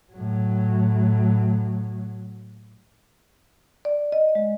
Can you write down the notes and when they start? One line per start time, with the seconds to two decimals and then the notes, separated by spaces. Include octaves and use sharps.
0.13 A2 F#3
3.85 D5
4.12 D#5
4.35 G#3